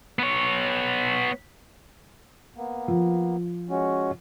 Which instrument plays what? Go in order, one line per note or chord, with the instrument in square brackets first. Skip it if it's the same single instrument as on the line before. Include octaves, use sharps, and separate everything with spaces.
[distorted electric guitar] B3 C#5
[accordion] A#3 B3
[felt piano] F3
[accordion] G#3 C#4 F#4